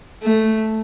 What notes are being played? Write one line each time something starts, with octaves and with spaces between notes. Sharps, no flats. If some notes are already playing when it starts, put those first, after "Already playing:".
A3